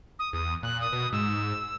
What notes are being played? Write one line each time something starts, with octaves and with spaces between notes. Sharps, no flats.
D#6
E2 D#6
A#2 F#6
D#6
B2
G#2 E6